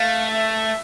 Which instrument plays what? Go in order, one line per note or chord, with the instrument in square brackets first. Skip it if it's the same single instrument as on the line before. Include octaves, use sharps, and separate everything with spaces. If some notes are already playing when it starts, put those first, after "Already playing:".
Already playing: [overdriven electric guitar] A3 [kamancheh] F5
[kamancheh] E5